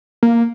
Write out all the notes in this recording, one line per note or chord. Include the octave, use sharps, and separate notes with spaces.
A#3